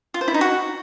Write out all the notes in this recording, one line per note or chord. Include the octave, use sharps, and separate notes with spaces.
F4
C5
E4
D#4
F#4